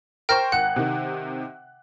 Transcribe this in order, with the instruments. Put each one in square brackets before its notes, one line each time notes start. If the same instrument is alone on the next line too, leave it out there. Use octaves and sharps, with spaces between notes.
[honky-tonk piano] A#4 C5 C#6 [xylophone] G5 F6 A#6
[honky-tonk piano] G#1 F#6 [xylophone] F#5
[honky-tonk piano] C3 D#3